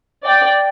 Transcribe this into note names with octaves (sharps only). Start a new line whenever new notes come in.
D5 G5